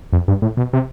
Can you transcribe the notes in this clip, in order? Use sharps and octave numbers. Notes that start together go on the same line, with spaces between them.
F2
G2
A2
B2
C3